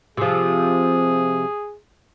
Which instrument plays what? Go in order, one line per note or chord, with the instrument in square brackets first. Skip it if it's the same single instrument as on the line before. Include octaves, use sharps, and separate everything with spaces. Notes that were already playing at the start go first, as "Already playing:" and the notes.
[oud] C3 F3 [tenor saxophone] G#4